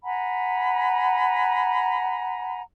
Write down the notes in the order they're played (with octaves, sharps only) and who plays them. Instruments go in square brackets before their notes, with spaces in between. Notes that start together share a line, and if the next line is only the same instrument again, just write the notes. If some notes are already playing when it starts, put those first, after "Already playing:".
[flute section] F#5 G#5 A#5 B5